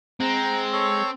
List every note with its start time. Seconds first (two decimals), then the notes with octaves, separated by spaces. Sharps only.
0.20 G#3 C4 F#5 A#5
0.73 A4 C#5